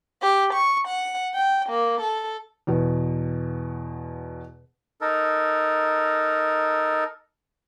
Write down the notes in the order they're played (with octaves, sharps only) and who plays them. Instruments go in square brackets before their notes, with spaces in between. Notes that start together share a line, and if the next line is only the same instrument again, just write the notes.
[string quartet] G4
C#6
F#5
G5
A#3
A4
[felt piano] E2 B2
[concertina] D#4 A4 A#4